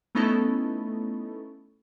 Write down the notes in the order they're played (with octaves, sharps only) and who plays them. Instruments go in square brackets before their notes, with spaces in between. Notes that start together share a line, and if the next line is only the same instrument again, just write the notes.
[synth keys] A3 B3 C#4 D#4 E4 A4